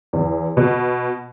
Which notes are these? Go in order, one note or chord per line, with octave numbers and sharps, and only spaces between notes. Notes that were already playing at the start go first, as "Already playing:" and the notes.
E2
B2